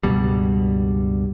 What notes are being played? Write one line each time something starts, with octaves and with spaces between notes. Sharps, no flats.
C#2 G2 B2 G3